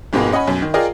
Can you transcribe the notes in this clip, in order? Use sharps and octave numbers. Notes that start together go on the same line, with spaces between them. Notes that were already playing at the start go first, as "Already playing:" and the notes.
F2 G#2 B2 G#3 A#3
C#4 D#5 F#5 G#5 B5
B1 F#2
D#3
F4 G#4 A#4 D5 D#5 G5